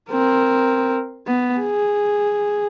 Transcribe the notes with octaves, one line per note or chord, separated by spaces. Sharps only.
C4 A#4
B3
G#4